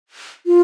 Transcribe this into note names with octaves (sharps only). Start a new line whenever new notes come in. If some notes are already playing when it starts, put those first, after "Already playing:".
F4